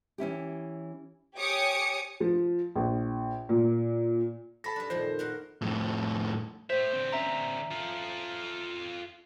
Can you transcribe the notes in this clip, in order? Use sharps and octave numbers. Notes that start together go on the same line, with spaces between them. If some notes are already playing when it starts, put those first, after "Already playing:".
E3 C#4 E4 G4
G4 C#5 G#5 D6 D#6 C#7
F3
A#1
A#2
A4 A5 B5 A#6
G2 D4
F2 A#2 D#3 C5
B3 F#4 A#4
F2 A2
A2 C5 E5
D3 C4
C#4 E5 A#5
F4 A4